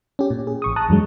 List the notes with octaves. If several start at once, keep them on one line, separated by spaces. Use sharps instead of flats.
C#4 G4
A#2
G#4
A1 C#6 D#6
A5 A#5 D#6 F#6
E2 G2 F#3 G#3